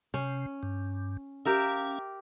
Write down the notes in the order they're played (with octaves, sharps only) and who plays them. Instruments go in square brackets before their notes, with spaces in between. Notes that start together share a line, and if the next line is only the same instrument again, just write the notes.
[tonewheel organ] C3 [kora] C#4
[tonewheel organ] G2
[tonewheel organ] C#4 F5 [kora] G4 A#4 E5